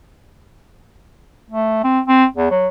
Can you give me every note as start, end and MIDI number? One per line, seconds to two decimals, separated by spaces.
1.50 1.83 57
1.84 2.00 60
2.08 2.25 60
2.36 2.50 40
2.51 2.68 54